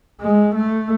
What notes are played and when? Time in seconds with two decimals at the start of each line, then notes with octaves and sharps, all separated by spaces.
0.20 G#3
0.55 A3